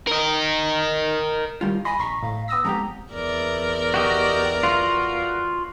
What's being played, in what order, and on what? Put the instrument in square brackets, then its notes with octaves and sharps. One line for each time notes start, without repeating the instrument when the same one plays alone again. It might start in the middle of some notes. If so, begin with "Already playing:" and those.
[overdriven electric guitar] A#4 D#5
[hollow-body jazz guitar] D#3 G3 F4
[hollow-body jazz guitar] D#5 [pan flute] G#5 [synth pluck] B5
[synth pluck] A#1 A#5 B6 [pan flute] C#6
[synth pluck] A2 [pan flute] F5
[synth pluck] B3 D#6 A#6 [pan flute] E6
[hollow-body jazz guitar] F2 G#2 G4 [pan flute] A#5
[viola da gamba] E2 A#4 D5
[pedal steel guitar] F#4 G4 D#5
F4 F#4